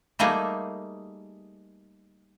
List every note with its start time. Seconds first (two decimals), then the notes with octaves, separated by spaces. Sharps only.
0.19 G3 A3 A#3 D#4 G#4